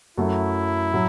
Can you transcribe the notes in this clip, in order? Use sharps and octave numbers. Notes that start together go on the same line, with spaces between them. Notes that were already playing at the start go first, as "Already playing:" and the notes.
F#2 F#3 A3 E4
A2 F#3